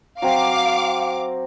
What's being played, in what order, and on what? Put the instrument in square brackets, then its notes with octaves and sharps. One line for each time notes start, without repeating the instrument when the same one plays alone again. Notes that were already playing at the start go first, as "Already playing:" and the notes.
[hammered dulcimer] F#3 C4 [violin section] F5 D6